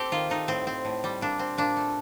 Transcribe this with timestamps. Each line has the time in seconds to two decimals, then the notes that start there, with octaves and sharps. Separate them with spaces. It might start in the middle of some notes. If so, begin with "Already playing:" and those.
Already playing: A3 C4 G4 A4
0.12 D#3 F4
0.30 A3 D#4
0.48 A2 C4
0.67 C4
0.85 A2
1.04 G3
1.21 A#2 D4
1.39 C4
1.58 A#2 D4
1.77 A3